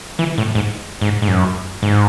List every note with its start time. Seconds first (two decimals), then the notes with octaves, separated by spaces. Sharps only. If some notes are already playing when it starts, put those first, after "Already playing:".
0.19 E3
0.38 A2
0.55 G#2
1.01 G#2
1.22 G#2
1.28 F#2
1.83 G#2